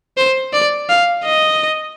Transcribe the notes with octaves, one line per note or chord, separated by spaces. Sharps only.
C5
D5
F5
D#5